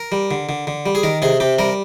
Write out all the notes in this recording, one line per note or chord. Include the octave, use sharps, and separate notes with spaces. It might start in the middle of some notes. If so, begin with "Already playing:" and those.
Already playing: A#4
G3
D3
D3
D3
G3
G#4
D#3 A#4
C3 G#4
C3 G4
G3 A#4